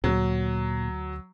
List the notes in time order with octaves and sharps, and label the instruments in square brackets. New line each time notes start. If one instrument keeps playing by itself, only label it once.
[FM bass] D2 [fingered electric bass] A#2 [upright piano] F#3